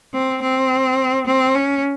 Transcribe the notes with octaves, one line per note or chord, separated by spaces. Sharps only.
C4
C4
C4
C#4